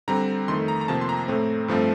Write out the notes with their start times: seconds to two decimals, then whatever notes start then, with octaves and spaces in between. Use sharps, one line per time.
0.08 D3 G3 C4 A#5
0.48 F2 D#3 A3 C6
0.68 A#5
0.81 A#5
0.88 F2 C3 F3 A#3 A5
1.01 C6
1.09 A#5
1.28 A2 A3 C4
1.68 G2 F3 A3 C4